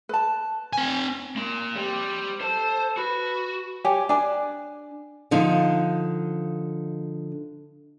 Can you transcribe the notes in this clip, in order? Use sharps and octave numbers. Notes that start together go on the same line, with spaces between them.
B4 A5
C4 G#5
A#3 C6
G3 C4
A4 C5
F#4 B4
G4 C#5 G#5
D4 G#5
D3 F3 D#4